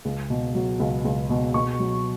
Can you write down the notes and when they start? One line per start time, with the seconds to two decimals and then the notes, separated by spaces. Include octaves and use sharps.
0.05 C#2
0.30 B2
0.55 F#3
0.80 C#2
1.05 C#2
1.30 B2
1.54 B2 C#6
1.80 F#3